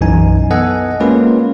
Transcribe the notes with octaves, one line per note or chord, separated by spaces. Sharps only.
B1 F#2 E3 D#4 G#5
B3 A4 D#5 F#5 G#5
G#3 A#3 C#4 F4 B4